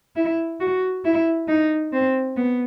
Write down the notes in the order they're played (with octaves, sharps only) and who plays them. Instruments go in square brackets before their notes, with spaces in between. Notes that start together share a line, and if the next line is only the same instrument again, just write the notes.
[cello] E4
F#4
E4
D#4
C4
B3